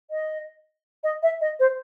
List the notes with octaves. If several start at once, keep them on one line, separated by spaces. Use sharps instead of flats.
D#5
D#5
E5
D#5
C5